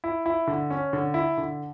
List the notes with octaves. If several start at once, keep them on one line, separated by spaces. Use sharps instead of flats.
E4
E4
D3
C#4
D3
E4
D3